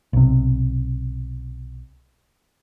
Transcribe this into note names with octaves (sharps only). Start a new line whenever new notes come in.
B1 C3